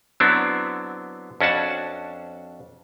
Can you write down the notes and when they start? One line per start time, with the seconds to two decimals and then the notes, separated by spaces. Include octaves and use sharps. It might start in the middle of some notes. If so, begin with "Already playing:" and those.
0.20 D3 F#3 B3 C4 D4 E4
1.41 F2 C#4 D4 F#4 F#5 A5